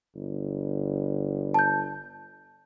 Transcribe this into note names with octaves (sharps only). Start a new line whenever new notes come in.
G1
A5 G6